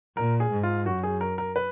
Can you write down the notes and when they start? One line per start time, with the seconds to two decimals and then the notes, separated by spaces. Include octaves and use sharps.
0.17 A#2 A#4
0.40 G#4
0.51 G#2
0.63 F4
0.86 F#2 F#4
1.03 G#4
1.21 A#4
1.38 A#4
1.56 B4